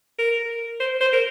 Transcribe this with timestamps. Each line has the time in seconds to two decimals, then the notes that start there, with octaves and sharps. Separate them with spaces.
0.18 A#4
0.80 C5
1.01 C5
1.13 A#4